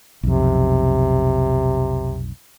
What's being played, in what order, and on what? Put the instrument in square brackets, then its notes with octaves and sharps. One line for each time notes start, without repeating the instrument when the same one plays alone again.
[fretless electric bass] B1 F2 [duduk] C3